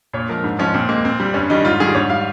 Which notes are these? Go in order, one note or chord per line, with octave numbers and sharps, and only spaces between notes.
A#2 C#5
F3 G#3 A#4
G#2
F3 G#3 C#4
A#2 C4
G#3 A#3
A#2 C4
G3
G2 C#4
D#3 G3 D#4
G#2 F4
D#3 G3 G#4
G#2 C#5
G3 F5